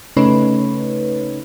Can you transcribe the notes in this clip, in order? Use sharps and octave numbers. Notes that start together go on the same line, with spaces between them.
C#3 A3 C#4 D#4 B4 C#5